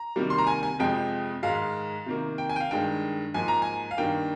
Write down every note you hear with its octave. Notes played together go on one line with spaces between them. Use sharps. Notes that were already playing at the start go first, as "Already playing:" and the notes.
Already playing: A#5
C3 D#3 G3 A#3
C6
A#5
G#5
G#5
F2 C3 F3 G#3 G5
G#2 D#3 G#3 F5
C3 D#3 A#3
G5
G#5
G5
F5
G2 D#3 G#3 G5
G#2 F3 A#3 G#5
A#5
G#5
F5
G2 D#3 A#3 G5